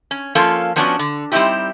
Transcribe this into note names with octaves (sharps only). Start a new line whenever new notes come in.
C#4
F3 A#3 C#4 F4 A4
F3 B3 C#4 D4 E4 F#4
D3
G3 C4 C#4 D#4 E4 G4